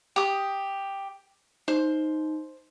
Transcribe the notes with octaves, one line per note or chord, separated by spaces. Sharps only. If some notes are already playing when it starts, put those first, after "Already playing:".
G4 D#6
D#4 C5